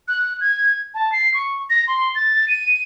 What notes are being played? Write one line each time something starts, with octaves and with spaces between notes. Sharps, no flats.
F#6
G#6
A5
C7
C#6
A#6
C6
A6
D#7